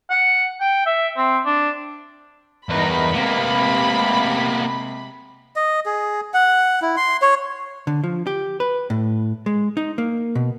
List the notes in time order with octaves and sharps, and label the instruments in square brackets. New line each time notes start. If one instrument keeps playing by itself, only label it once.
[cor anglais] F#5
G5
E5
C4
D4
[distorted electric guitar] E2 B4 [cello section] G2 D#4 A#4 [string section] B5
[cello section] C3 G#3 [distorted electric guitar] A#3 B3
[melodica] D#5
G#4
F#5
E4
C6
C#5
[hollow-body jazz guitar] D3
F3
G4
B4
A2
G#3
D#4
A#3
B2